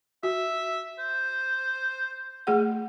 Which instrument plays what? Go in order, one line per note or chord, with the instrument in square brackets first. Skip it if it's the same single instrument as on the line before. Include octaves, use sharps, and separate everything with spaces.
[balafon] F#4 [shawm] E5
[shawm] C5
[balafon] A3 G#4 F#5